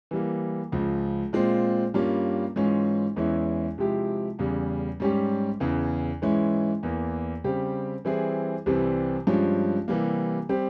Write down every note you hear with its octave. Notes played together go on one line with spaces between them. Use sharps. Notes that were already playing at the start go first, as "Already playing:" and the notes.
E3 G3 A#3
C#2 C#3 F3
A#2 G#3 C4 F4
G2 G3 A#3 C#4 F4
G#2 E3 G#3 C#4 F4
E2 E3 G#3 C#4 E4
C3 F3 G#3 E4 G4
E2 C#3 G3
G#2 G3 C#4 G4
E2 C#3 E3
G#2 E3 G#3 C#4 E4
E2 E3 A#3
C#3 G3 C4 G4
E3 G3 C4 E4 G#4
C2 C3 E3 G3 C4
G2 F3 G#3 C#4
C3 E3 G3 A#3
G3 C4 G4